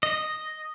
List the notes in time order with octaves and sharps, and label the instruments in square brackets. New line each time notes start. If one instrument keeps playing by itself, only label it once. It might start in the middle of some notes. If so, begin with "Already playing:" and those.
[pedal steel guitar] D#5